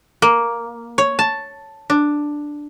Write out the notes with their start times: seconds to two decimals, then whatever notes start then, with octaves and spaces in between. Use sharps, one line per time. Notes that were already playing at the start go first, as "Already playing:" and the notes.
0.22 A#3
0.98 C#5
1.19 A5
1.90 D4